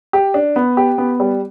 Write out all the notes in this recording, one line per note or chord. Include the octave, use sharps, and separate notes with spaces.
G4
D4
B3
G4
B3
G3